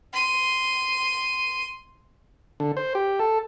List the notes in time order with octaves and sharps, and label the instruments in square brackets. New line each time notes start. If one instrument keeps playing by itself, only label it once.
[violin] C6 D#7
[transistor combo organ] D3
C5
G4
A4